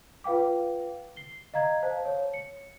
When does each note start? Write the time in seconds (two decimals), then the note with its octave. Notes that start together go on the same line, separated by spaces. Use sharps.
0.24 F4 B4 F5 G5 D6
1.16 C7 G7
1.54 D#5 F5 A#5 G#6
1.83 C5 F5 A5
2.05 C#5
2.34 C#7